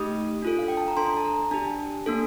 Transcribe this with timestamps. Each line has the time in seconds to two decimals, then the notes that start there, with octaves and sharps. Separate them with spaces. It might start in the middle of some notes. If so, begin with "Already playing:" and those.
Already playing: A3 D#4 G4 D#6
0.42 D4 F4 A4
0.59 F5
0.68 G5
0.77 A5
0.88 A#5
0.97 D4 A4 C6
1.17 A5
1.25 A#5
1.51 D4 G4 A5
2.06 A#3 D4 A4